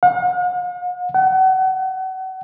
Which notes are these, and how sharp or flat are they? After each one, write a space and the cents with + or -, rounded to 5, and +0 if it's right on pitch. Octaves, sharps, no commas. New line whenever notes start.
F#5 -45
F#5 +35